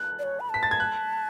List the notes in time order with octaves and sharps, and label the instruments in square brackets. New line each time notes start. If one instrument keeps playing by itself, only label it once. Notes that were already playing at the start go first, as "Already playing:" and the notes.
Already playing: [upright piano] F#6
[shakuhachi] D5
C#5
B5
[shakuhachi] A5 [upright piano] B6
[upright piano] A6
G#6
F#6